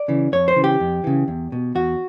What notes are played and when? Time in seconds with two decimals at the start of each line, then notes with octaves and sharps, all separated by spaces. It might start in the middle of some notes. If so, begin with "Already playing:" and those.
Already playing: D5
0.08 C#3 E3
0.32 F2 C#5
0.48 C5
0.56 C#3 E3
0.64 G4
0.80 F2
1.04 C#3 E3
1.28 E2
1.52 B2
1.75 E2 F#4